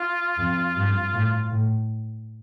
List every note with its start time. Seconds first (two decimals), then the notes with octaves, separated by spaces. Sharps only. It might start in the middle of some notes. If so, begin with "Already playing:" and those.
Already playing: F4
0.38 F2
0.75 G2
1.13 A2
1.51 A2